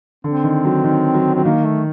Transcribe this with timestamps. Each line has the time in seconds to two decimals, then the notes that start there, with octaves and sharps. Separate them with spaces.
0.24 D3 C4
0.44 D#3
0.64 F#3
0.84 D#3
1.14 F#3
1.35 F#3 C4
1.44 D#3 A#3
1.65 A3